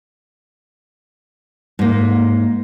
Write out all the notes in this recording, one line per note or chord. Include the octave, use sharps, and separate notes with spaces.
G#2 A#3